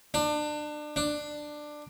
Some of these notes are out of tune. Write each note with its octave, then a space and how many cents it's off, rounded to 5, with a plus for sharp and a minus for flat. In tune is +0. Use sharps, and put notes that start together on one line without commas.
D4 +30
D4 +15